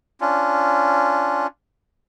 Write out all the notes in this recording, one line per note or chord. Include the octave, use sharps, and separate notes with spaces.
C#4 D4 F4